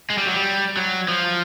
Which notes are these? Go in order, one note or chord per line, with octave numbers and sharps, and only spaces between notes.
G#3
G3
F#3
G3
F#3
F3